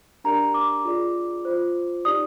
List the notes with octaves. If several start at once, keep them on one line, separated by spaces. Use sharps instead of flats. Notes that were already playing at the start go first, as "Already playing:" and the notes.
D4 G4 A#4 D5 A#5
D6
F4 G#4 D5
F4 C5
D#4 G4 D5 D#6